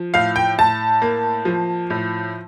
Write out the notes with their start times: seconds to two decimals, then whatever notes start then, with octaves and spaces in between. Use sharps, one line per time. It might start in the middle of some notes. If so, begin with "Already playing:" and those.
Already playing: F3
0.14 A2 F5
0.36 G5
0.58 A2 A5
1.02 A#3
1.45 F3
1.90 A2